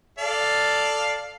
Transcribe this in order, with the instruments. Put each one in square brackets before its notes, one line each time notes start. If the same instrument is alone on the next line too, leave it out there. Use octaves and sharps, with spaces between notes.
[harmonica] A4 D5 F5